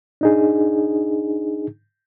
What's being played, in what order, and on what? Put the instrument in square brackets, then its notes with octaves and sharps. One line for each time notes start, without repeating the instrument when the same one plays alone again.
[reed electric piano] D4 D#4 G#4